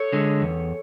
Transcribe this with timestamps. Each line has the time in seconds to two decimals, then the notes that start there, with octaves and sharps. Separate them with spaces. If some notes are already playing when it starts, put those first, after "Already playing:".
Already playing: A4 C#5
0.13 D3 G#3
0.42 E2